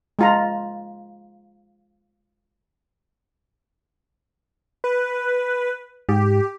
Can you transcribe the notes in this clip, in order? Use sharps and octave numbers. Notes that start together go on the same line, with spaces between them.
G#3 F4 A#5
B4
G#2 G4